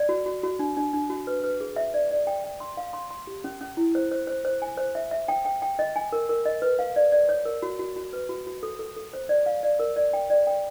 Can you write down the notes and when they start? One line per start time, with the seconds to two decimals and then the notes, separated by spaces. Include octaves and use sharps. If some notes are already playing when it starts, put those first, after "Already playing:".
Already playing: D5
0.09 F#4
0.26 F#4
0.43 F#4
0.59 D4
0.77 D4
0.93 D4
1.10 F#4
1.27 B4
1.44 B4
1.61 G#4
1.76 E5
1.94 D5
2.11 D5
2.27 G5
2.44 G5
2.60 C6
2.77 F5
2.93 C6
3.10 C6
3.27 G4
3.44 C#4
3.61 C#4
3.77 E4
3.95 C5
4.12 C5
4.27 C5
4.45 C5
4.62 G#5
4.77 C5
4.95 E5
5.11 E5
5.28 G5
5.45 G5
5.62 G5
5.79 D#5
5.96 G#5
6.12 A#4
6.29 A#4
6.45 D#5
6.62 B4
6.79 F5
6.96 D5
7.12 D5
7.29 C#5
7.45 A#4
7.62 F#4
7.79 F#4
7.96 F#4
8.13 B4
8.29 F#4
8.47 F#4
8.63 A4
8.79 A4
8.96 A4
9.13 C5
9.29 D5
9.46 F5
9.63 D5
9.79 A#4
9.96 D5
10.13 G5
10.30 D5
10.47 G5